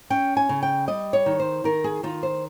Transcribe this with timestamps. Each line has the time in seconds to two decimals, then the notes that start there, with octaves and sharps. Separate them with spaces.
0.10 C#4 G5
0.37 G#5
0.49 C#3
0.63 G5
0.88 G3 D#5
1.13 C#5
1.26 D#3
1.40 C5
1.64 D#3 A#4
1.84 G#4
2.03 D#3 F4
2.23 C5